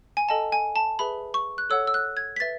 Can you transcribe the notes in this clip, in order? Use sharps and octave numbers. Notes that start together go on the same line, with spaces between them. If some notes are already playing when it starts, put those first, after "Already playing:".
G#5
A4 D#5 F#5 A5
G#5
A5
G#4 B4 E5 B5
C#6
F#6
A4 C#5 F#5 E6
E6
F#6
G#6
B6
B4 E5 A6